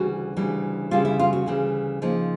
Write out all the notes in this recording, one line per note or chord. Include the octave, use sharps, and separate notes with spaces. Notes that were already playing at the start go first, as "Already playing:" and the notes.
Already playing: D2 C#3 E3 G3 F#4
D2 C#3 E3 G3
D2 C#3 E3 G3 F4
E4
F4
F#4
D2 C#3 E3 G3
C#3 F3 A#3 D#4